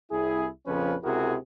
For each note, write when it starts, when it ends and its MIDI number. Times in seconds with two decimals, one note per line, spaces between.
0.11 0.47 36
0.11 0.47 64
0.11 0.47 68
0.67 0.95 34
0.67 0.95 41
0.67 0.95 49
0.67 0.95 53
0.67 0.95 61
0.67 0.95 71
1.03 1.35 37
1.03 1.35 48
1.03 1.35 64
1.03 1.35 66
1.03 1.35 68
1.03 1.35 70